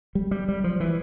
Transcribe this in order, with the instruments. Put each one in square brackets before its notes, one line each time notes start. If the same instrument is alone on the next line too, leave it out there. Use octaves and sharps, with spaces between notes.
[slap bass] G3
G3
G3
F3
E3